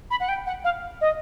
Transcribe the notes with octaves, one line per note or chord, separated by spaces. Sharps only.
B5
F#5
G5
F#5
F5
D#5